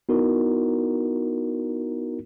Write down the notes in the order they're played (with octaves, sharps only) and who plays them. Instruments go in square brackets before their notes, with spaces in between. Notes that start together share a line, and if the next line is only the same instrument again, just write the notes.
[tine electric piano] B3 D#4 E4 F#4 A#4